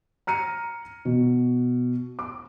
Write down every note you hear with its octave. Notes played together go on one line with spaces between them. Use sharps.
A#5 F6 C#7 D#7
B2
D6